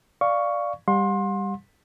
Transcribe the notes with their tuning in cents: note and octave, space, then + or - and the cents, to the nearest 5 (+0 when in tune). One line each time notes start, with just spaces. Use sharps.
D5 +0 F5 +0 C#6 +10
G3 +15 F#5 -45 C6 +25